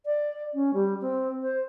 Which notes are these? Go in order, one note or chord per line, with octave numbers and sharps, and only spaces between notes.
D5
C#4
G3
C4
C5